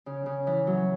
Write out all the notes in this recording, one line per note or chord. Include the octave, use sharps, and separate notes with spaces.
C#3
C#3
E3
F#3